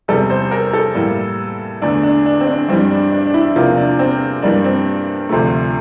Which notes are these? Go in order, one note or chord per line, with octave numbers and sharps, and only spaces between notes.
E2 C3 G3 A4
C5
A#4
A4
A2 E3 G3 A#3
E2 D3 A3 D4
D4
D4
C4
D4
G2 E3 G3 C4
D4
D4
D4
E4
E2 C3 F3 A#3 F4
D4
C4
G2 E3 G3 A#3 D4
C4
D2 C3 F3 A3